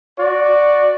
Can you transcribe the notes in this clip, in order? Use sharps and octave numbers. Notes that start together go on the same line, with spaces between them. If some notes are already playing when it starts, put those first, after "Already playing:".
F#4 D5